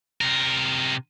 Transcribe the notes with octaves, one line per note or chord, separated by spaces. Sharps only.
C3 A#4